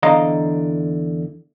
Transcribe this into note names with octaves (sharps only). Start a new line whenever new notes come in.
E2 D3 D#5 F5 A#5